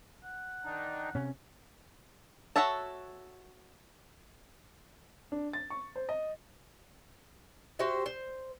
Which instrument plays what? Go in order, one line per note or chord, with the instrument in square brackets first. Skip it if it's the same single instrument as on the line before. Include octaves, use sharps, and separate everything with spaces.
[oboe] F#5
[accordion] D#3 D4 D#4
[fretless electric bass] C3 C#4
[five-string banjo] F#4 A4 C#5 E5 A5
[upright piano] D4
A6
C#6
C5
D#5
[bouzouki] F#4 G4 C5 E5
C5